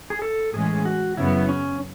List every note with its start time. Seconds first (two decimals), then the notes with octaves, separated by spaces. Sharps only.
0.10 G#4
0.22 A4
0.53 A2 E3 G#3 C#4 G#4
0.85 F#4
1.17 F#2 C#3 F#3 B3 E4
1.49 C#4